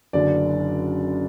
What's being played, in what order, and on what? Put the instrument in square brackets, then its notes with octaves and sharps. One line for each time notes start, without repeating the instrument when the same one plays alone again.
[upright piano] F#1 F#2 D3 D5